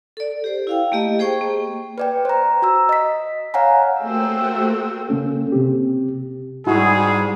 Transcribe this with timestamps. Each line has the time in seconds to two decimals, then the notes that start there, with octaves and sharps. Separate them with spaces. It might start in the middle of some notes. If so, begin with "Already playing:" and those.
0.17 A4 D5
0.44 G4 C5
0.67 E4 F5 G5
0.92 A3 A#3 G4 D#5
1.19 G#4 C5 G5 C#6
1.41 A#3
1.98 B4 D5 G5
2.25 C5 A#5
2.62 F#4 A#5 E6
2.89 D#5 B6
3.54 C#5 F5 F#5 G#5 A#5
4.02 A3 A#3 C4 F#4 G4 C5 G5 E6
5.09 C#3 A#3 C#4 A4
5.52 C3 C4 G4
6.67 G#2 G3 E4 F#4 G#4